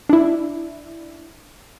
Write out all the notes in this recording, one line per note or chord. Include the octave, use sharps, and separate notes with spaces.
D4 E4